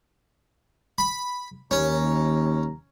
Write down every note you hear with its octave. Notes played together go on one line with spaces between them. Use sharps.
B5
D#2 C#4 A#5